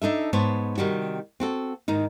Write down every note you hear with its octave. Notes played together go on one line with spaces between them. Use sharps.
D4 D#4 A4 E5
G#2 B3 C5 C#5 A5
C3 D#3 G3 F#4
C4 F#4 A4
G#2 D#3 D#4